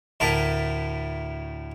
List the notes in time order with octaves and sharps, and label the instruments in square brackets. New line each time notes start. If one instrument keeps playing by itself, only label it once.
[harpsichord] D2 A2 E4 A#4 A5